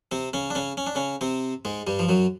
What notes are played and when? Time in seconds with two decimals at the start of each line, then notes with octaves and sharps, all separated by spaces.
0.11 C3 C4
0.33 C#3 C#4
0.50 D4
0.55 C#3 C#4
0.77 C#4
0.87 D4
0.95 C#3 C#4
1.21 C3 C4
1.65 G#2 G#3
1.87 G2 G3
1.99 F3
2.09 F#2 F#3